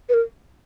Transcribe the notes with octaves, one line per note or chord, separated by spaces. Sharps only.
B4
A#4